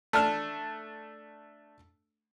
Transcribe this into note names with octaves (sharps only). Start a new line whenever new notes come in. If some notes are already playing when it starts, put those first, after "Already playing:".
A3 D4 A5 F6